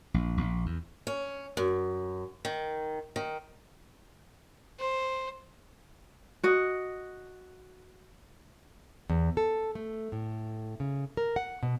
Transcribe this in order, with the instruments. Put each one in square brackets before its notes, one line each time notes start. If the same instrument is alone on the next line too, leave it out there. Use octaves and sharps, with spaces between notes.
[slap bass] A#1
A#1
E2
[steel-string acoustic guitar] C#4
F#2
D#3
D#3
[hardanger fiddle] C5
[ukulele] F#4 D#5
[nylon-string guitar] E2
A4
A3
A2
C#3
A#4
F#5
B2